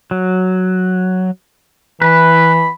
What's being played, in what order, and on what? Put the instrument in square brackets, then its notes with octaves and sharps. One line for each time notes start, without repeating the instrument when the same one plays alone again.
[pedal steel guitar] F#3
[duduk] E3 [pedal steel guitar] B4 [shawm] B5